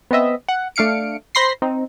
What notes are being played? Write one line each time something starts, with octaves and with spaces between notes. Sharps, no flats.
B3 C4 D#5 E5
F#5
A3 D4 F5 C#7 D7
C5 B5 C6 A#6 C7
C4 D#4